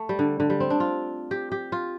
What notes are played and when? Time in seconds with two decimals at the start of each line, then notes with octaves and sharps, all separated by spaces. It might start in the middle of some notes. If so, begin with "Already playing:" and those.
Already playing: A3
0.09 G3
0.19 D3
0.40 D3
0.50 G3
0.60 C4
0.70 D4
0.80 F4
1.31 G4
1.52 G4
1.72 F4